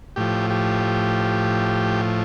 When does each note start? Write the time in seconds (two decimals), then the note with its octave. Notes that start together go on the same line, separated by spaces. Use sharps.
0.16 A2 F3 G4
0.50 G4